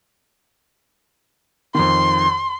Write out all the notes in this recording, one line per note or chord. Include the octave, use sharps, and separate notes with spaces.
F2 D#3 C6